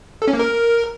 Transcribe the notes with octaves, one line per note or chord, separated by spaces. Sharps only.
A4
C#4
A#3
A#4